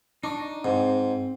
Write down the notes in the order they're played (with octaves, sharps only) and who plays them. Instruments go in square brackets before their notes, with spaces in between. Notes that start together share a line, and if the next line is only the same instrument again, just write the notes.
[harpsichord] D4 [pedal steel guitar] D#4 C#6 D6
[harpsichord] G#2 [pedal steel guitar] C4